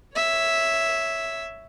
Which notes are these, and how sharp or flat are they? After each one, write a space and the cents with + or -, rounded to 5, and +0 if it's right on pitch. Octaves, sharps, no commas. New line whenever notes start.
C#5 +0 E5 +0